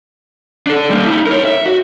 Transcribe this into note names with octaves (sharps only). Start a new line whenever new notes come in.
D4 A4
G3 A#3
D#4 E4
A#4 C#5
E5
F#4